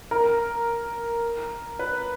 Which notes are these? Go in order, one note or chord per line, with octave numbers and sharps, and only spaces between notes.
A#4
B4